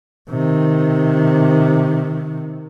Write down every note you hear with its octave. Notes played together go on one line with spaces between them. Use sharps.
C3 D#3